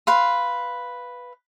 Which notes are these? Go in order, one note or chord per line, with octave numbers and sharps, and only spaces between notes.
B4 F5 C6